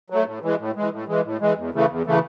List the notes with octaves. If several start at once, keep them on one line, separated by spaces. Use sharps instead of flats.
F#3 A3
A2
E3 G#3
A2
E3 G#3
A2
E3 G#3
A2
E3 G#3
E2
C#3 E3 A3
E2
C#3 E3 A3